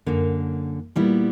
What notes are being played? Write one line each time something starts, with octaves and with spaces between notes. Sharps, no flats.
F#2 D3 A#3
A#2 G3 B3 E4